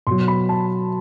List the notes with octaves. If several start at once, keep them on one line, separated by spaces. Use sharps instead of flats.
B2 F#3 C6
B5
A5